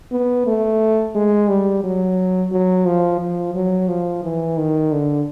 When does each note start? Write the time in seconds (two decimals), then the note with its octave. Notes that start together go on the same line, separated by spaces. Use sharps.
0.12 B3
0.47 A3
1.15 G#3
1.48 G3
1.84 F#3
2.52 F#3
2.86 F3
3.20 F3
3.55 F#3
3.88 F3
4.23 E3
4.58 D#3
4.92 D3